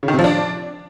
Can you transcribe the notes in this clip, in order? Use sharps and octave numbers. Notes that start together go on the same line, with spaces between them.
C#3
D#3
C3
F3
D4